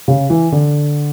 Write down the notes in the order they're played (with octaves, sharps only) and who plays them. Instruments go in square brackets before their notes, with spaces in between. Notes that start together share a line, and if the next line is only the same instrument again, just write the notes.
[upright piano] C#3
E3
D3